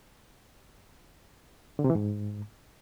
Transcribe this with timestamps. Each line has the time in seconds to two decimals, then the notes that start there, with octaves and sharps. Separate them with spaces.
1.79 D3
1.84 C3
1.90 E3
1.95 G#2